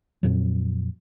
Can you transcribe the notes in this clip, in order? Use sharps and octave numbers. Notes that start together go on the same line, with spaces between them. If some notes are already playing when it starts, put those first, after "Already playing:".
F2 A#2 F#3